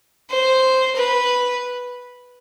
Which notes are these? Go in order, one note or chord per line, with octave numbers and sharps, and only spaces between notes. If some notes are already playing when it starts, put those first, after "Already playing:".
C5
B4